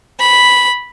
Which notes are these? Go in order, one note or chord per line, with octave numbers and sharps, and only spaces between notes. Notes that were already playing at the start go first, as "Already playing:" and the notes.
B5